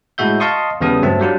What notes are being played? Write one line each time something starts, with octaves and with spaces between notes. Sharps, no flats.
A2 G#3 F#4 E5 G6
D#5 F5 A5 C6 C#6 D#6
E2 C#3 G3 B3 A4 D#6
G2 F#3 A3 C4 E5 A5
F#3 G3 D4 F4